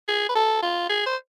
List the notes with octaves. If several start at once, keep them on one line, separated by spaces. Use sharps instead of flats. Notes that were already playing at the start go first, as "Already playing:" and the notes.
G#4
B4
A4
F4
G#4
C5